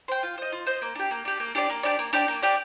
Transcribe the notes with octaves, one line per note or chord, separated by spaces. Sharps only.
C5 G5
F4
C5 D#5
F4
C5 D#5
A#3
D4 G4
A#3
D4 G4
A#3
D4 G4 D5
A#3
D4 G4 D5
A#3
D4 G4 D5
A#3
D4 G4 D5